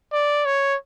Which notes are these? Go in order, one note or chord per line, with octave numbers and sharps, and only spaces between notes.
D5
C#5